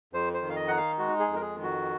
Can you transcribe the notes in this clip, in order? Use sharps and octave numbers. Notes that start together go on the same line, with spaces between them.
F2 C5
C5
D#3
F5
D#5
D#4 F#5
F5
G#3 F#4
G#4
F2
A#4
G#4
D#3
F#4